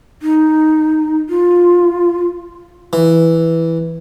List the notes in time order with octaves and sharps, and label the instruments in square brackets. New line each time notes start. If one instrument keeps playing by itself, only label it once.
[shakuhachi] D#4
F4
[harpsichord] E3